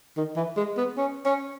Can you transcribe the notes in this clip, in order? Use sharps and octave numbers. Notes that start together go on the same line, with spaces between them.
D#3
E3
G#3
B3
C#4
C#4